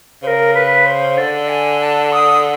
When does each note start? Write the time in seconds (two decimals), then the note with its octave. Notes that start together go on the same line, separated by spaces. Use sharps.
0.22 C#3 C5
0.27 A#4
0.55 B4
0.86 C5
1.17 D3 D5
1.49 G#5
1.81 A5
2.12 D#6